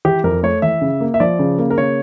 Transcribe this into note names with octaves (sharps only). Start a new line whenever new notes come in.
E3 G4
F2 A#4
A3 C#5
E3 E5
C#3
A#3
E5
F3 D5
C#3
A#3
A#4
C#3 C#5